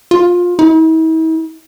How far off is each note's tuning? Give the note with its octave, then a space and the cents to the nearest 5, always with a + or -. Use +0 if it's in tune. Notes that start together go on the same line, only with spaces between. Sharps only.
F4 +20
E4 -45